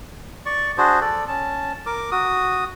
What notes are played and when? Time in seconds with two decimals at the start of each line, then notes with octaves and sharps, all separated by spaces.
0.46 D5 C#6
0.78 D4 F#4 G#4 C5
1.01 A4 D5
1.28 C#4 A5
1.86 A#4 D6
2.11 F#4 D#6